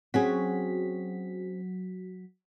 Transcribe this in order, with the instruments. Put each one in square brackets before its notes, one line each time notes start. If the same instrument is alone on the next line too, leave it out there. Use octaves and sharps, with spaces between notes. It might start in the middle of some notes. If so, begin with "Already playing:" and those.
[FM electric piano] F#3 F#4 B6 [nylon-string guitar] C4 C#4 G#4